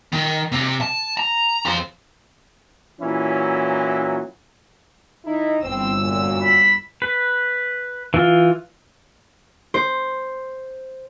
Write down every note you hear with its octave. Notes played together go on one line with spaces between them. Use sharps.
D#3
C3
A5
A#5
F2 C5
A#2 E3 F#3 C#4 E4
D#3 D#4 E4
G1 E3 C4 E6
F#2 A#2
B5
B4
E3 F4
C5